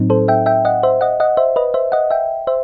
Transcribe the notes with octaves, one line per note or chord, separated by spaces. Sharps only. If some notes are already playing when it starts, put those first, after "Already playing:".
Already playing: A2 F#3 C4 D#4
A4 C5
E5 G5
E5 G5
D#5 F#5
C5 E5
D#5 F#5
D#5 F#5
C5 E5
B4 D#5
C5 E5
D#5 F#5
E5 G5
C5 E5